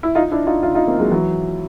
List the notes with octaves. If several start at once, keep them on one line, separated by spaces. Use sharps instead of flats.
E4
D#4 F4
D4 E4
D#4 F4
D#4 F4
D#4 F4
A#3 C4
F#3 G#3
E3 F#3